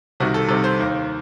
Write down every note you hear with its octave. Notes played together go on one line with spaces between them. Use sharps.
C2 C3 D#3 F#4
A4
C2 C3 D#3 A4
C5
D#2 D#3